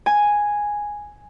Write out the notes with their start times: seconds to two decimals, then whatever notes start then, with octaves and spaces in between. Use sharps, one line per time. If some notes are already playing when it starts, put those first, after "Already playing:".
0.06 G#5